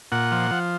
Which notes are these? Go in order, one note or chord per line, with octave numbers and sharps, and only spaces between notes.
A#2 F#5
F3
F3